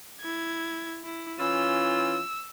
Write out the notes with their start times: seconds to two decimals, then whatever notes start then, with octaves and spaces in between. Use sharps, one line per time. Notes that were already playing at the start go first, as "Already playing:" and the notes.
0.21 E4 G#6
1.04 E4
1.39 E3 C#4 F4 E6